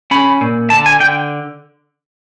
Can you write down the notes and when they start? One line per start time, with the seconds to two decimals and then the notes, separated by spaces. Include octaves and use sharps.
0.11 C#4 B5
0.41 A#2
0.70 D3 A5
0.86 G#5
1.00 D3 G5